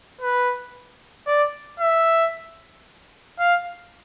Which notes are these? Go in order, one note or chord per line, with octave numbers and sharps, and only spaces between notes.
B4
D5
E5
F5